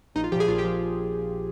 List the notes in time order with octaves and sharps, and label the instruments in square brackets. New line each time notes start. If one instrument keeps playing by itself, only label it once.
[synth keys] A#1 D#4
F4
F3 G4
A#2 G#4
A#1 F4
G4
F3